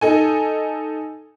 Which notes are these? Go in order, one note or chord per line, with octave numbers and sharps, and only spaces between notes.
D#4 A4 G#5